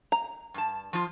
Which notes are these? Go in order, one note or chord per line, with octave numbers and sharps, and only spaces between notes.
A#5
G2 A5
F3 F4